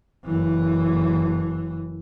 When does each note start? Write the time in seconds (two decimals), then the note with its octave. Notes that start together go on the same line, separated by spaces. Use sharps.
0.25 F#1 E3